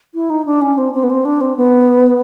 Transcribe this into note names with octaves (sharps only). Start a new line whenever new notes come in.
E4
D#4
D4
C#4
C4
C4
B3
C4
D4
C4
B3